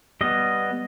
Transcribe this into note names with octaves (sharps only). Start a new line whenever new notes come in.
G3 B3 D#5